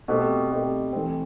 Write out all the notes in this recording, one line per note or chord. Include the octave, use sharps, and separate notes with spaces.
B2 A3 C4 G4
B2 A3 C4 G4
E3 A3 C4